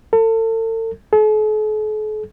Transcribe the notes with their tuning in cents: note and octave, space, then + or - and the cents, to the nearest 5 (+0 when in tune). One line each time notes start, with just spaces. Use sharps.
A4 +40
A4 -45